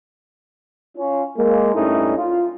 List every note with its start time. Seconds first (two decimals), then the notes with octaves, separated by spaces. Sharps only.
0.97 C#4 F4
1.37 G#3 A#3
1.75 G2 A3 C#4 D#4 E4
2.17 F4